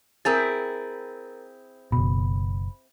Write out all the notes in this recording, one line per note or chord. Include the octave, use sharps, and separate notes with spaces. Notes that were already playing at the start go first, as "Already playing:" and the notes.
C4 E4 G#4 A#4 A#5 A6
F#1 B2 B5